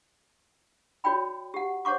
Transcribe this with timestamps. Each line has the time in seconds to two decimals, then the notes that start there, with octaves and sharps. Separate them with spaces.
1.04 F#4 C#5 D5 G5 B5
1.54 G4 F#5
1.85 C5 C#5 F#5 C#6 D6